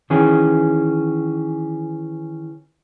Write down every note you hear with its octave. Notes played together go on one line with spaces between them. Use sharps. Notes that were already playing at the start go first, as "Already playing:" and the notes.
D#3 E3 C#4 G#4